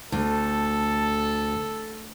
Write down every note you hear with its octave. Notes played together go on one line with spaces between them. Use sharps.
D2 A4